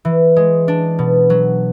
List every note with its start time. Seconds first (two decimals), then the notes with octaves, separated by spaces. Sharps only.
0.05 E3
0.36 G#3
0.68 D4
0.99 B2
1.30 F#3